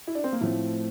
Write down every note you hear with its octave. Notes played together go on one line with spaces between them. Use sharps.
E4
D4
C4
A#3
A2 F3 A3 C4